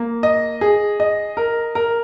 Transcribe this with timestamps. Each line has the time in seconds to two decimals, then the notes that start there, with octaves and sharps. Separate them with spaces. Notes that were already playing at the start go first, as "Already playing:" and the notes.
Already playing: A#3
0.23 D#5
0.61 G#4
1.00 D#5
1.37 A#4
1.75 A#4